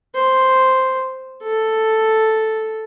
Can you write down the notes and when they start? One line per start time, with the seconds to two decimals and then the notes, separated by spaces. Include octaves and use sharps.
0.15 C5
1.43 A4